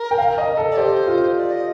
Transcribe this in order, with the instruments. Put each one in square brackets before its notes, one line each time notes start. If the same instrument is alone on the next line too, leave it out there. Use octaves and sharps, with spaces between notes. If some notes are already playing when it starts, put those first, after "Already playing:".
Already playing: [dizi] A#4
[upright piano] G5
F5
D#5
A4
[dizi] D5
[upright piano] G4 [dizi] C5
[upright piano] F4
[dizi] D5
D#5